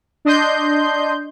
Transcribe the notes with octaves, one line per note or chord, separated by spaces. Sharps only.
D4 D#5 C6 G6